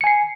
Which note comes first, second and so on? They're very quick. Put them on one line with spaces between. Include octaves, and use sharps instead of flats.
C#7 G#5 C7